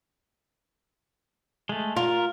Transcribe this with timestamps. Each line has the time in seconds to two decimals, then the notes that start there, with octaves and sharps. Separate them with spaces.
1.69 G#3 A3
1.97 F4 A#4